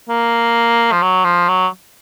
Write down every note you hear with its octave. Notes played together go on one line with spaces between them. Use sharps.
A#3
F3
F#3
F3
F#3